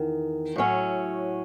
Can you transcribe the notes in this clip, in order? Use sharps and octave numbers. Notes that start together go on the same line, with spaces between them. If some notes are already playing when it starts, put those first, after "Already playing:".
Already playing: E2 D#3
A2 F#3 C#4